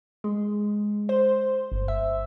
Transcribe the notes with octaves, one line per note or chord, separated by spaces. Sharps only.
G#3
C5
G1
E5